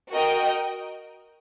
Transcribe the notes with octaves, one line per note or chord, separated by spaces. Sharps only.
F#4 A#4 D#5 G5